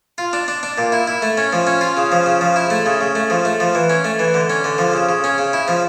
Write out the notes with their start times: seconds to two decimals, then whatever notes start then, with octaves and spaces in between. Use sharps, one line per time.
0.18 F4
0.33 D4
0.48 D4
0.63 D4
0.78 A#2
0.92 E4
1.07 E4
1.22 A3
1.38 C#4
1.53 F3
1.67 C#4
1.81 F4
1.97 C#3
2.12 F3
2.26 C#3
2.41 F3
2.56 E4
2.70 A3
2.86 C#3
3.01 C#3
3.15 A3
3.30 F3
3.45 A3
3.60 F3
3.75 E3
3.90 C#4
4.04 A3
4.19 E3
4.34 D3
4.50 C#4
4.64 D3
4.78 F3
4.93 C#3
5.09 C#3
5.24 C#4
5.38 C#3
5.53 E4
5.68 F3